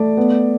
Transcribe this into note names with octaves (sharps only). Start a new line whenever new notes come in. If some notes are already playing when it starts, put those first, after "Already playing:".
Already playing: A3 D5
B3